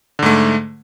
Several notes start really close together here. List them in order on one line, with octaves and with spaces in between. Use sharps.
D3 G#2 A3